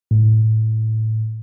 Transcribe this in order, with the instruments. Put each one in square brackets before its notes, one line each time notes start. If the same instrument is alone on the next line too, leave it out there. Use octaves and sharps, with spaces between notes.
[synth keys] A2